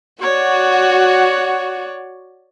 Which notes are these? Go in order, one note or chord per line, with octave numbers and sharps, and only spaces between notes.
F#4 C#5 D5